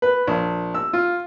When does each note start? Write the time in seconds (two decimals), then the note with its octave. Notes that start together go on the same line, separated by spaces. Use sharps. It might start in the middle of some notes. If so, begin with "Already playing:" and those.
0.02 B4
0.27 A#1
0.74 E6
0.93 F4